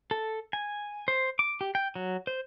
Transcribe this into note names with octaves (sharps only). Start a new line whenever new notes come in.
A4
G#5
C5
D6
G4
G5
F#3
C5